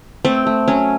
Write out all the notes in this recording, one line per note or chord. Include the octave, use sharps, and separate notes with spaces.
A3 C4
A3
F#3 C#4